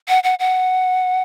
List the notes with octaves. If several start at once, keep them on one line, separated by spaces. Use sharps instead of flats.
F#5
F#5
F#5